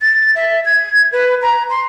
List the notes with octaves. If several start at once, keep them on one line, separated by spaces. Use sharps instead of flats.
A6
E5
G#6
B4
A#5
C6